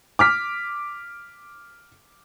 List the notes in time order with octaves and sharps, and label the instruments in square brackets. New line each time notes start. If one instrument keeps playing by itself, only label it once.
[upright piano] D6 F6 B6